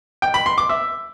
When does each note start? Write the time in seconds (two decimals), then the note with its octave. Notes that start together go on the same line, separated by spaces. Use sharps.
0.22 G5
0.34 B5
0.46 C6
0.58 D6
0.69 E5